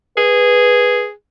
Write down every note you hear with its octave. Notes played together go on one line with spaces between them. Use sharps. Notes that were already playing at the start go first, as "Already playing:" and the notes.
G#4 B4